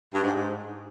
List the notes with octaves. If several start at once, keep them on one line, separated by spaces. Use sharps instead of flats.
G2
G#2
G#2